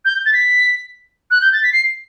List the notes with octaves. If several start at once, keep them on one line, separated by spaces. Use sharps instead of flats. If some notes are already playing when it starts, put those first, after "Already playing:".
G6
A6
B6
F#6
G6
A6
B6
C7